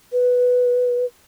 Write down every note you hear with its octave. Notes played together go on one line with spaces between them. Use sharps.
B4